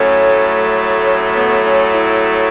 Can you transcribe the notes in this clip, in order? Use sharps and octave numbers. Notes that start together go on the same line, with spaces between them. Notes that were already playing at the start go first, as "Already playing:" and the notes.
Already playing: A2 F#3 A3 C#4
C#4
B3
C#4
E4